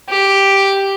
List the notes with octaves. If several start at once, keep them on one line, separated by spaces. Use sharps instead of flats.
G4